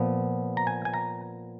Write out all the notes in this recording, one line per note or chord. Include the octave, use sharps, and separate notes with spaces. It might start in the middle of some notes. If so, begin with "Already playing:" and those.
Already playing: A#2 F3 B3
A#5
G#5
G#5
A#5